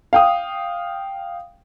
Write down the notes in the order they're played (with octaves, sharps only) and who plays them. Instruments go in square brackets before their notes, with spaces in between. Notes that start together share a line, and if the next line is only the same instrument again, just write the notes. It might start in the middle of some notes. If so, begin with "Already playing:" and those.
[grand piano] F5 G5 D#6